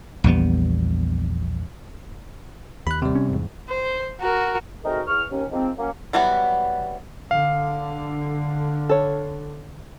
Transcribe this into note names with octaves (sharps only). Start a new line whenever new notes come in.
A#1 E2 G3 B3
D#2 B5 F#6
C3 G3
C#4
E2 G#2
C5
F#4 A#4
G#3 A3 C4 D#4 F#4 A#4
E2 C#6 F6
D#2 C#4
D#3 F3 G#3 A#3 C4
F#3 A#3 C#4
E3 F#3 G3 B3 F#4
D3 F5
A4 C#5